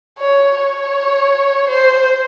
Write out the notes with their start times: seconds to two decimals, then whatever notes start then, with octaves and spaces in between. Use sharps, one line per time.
0.18 C#5
0.56 C#5
1.69 C5